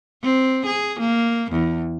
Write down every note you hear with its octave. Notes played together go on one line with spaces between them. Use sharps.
C4
G#4
A#3
E2